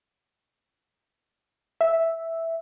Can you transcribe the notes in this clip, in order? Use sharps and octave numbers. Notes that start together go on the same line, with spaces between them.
E5